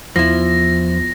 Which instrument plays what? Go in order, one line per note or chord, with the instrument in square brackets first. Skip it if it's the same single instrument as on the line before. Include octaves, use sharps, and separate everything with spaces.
[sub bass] E2 [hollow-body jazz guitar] F3 E4 [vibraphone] B3 F4 [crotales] A#6